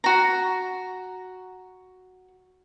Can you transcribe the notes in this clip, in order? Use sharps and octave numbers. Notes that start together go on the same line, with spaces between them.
F#4 A#5